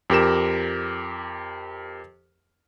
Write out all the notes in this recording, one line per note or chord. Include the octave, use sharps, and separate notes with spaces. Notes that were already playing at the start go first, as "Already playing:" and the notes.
F2 G4 A#4 E7